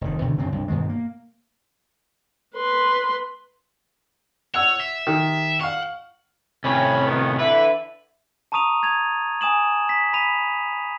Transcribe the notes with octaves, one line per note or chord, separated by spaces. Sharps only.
F1 D#3
B2 D3 D#3
F#2 C#3 F#3 C4
C2 G2
G2 B2 D#3 G#3
A#3
B4 C6
C#5 F#5 E6
E5
D#3 G4
F5 F#5 C#6
A2 C3 C#4 B5
D#3 B3 C#4
D3 E3 B4 E5
A5 A#5 C#6 D#6 D#7 F7
D#6 G#6 A6 F7
G#5 D#6 E7 F#7
B6
B5 B6 D#7 F7